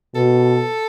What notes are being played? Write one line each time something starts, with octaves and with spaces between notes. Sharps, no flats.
B2 A4